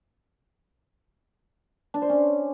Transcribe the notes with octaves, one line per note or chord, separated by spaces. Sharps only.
D4
C5
C#4